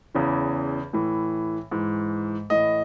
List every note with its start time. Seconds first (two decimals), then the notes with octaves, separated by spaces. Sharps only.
0.15 E2 C#3 E3
0.93 A2 E3
1.71 G#2 E3
2.50 A2 E3 D#5